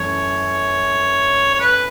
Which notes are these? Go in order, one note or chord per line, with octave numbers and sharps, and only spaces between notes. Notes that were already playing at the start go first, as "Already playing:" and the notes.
Already playing: F#2 E3 A3 C#5
C#5
B4